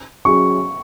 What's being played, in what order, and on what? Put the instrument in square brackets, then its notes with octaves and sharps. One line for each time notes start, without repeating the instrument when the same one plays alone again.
[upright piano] F#3 C#4 G#4 [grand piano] C#6